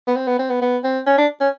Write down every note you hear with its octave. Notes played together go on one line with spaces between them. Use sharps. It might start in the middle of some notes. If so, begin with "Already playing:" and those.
B3
C4
B3
C4
B3
B3
C4
C#4
D4
C#4